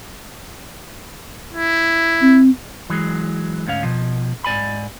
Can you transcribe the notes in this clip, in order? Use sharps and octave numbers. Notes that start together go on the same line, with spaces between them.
E4
C4
E3 F#3 G#3
D2 G#2 C#4 F5
B2 F3
G#2 D5 G#5 B5